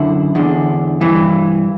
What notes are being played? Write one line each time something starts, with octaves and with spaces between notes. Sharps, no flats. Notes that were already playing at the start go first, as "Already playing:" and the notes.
Already playing: F#2 D3 E4
E2 D3
G2 E3